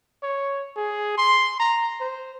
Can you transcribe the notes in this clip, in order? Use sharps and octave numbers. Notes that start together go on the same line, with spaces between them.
C#5
G#4
C6
A#5
C5